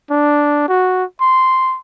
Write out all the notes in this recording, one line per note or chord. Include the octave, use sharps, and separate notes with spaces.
D4
F#4
C6